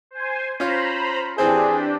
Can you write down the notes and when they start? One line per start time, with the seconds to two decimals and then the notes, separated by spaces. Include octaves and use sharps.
0.11 C5 G#5
0.60 C#4 F4 C5 A#5 B5
1.38 E3 C4 D4 G4 G#4 C5